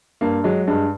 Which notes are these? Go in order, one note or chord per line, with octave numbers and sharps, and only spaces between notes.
G2 A#3
F#3 G#3
G2 G#3